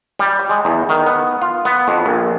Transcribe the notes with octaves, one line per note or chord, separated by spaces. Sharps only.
G3
G#3
E2
D#3
B3
F4
B3
F2
A#1